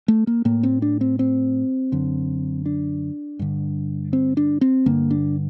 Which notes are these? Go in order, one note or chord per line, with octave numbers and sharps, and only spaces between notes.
A3
A#3
A2 A#3
C4
D4
C4
C4
F#2 D3
D4
G2 D3
C4
D4
C4
G2 D3 A#3
D4